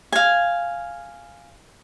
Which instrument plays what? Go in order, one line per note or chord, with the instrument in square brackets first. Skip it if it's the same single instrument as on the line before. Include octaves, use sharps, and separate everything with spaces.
[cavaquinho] F5 G#5